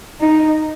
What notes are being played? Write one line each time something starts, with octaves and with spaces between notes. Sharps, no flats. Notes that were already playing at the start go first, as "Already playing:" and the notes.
D#4